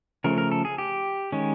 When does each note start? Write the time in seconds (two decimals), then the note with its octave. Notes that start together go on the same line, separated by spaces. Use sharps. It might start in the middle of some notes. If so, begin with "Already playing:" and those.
0.24 C#3 F3 A3 A#4
0.38 A#4
0.52 A4
0.65 G#4
0.78 G4
1.32 D#3 G#3 C#4